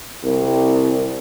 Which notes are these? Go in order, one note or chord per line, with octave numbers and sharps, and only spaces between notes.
C2